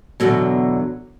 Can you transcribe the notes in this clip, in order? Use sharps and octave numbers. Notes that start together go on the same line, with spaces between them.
E2 G#2 B2 D3 F#3